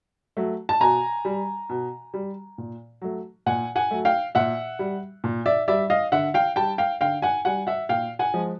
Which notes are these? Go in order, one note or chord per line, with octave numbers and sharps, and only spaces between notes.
F#3 A3
A5
B2 G#5 A#5
G3
B2
G3
A#2
F#3 A3
A#2 F#5 G#5
F#5 G#5
F#3 A3
F5 G5
A#2 E5 F#5
G3
A#2
D5 E5
G3 D5 E5
D#5 F5
D3 E5 F#5
F5 G5
G3 G5 A5
F5 G5
D3 F5 G5
F#5 G#5
G3 F#5 G#5
E5 F#5
A#2 F5 G5
F#5 G#5
F3 G#3